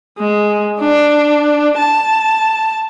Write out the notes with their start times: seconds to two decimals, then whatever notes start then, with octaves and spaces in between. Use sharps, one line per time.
0.18 G#3
0.80 D4
1.78 A5